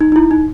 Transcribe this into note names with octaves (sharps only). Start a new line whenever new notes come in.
D#4
D#4
E4
D#4